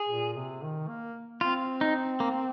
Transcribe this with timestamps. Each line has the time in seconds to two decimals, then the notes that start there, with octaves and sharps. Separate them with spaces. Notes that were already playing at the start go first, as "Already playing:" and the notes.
Already playing: G#4
0.09 A#2
0.37 C3
0.63 D#3
0.88 A#3
1.41 C4 F4
1.81 D#4
2.20 A#3